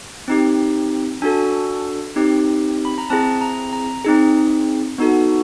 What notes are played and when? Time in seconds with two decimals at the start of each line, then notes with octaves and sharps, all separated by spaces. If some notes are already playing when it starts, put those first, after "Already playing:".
0.28 C4 D#4 G4
1.22 D4 F#4 A4 G#5
2.16 C4 D#4 G4
2.85 B5
2.98 A#5
3.10 C4 E4 G#4 A5
3.41 A#5
3.73 A#5
4.04 C4 D#4 G#4
4.98 B3 D#4 F#4 A4